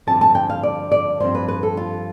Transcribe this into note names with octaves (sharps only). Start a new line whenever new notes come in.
G2 D3 F3 C4 A5
A5
G5
F5
D5
D5
G2 F3 C4 C5
B4
B4
A4
F4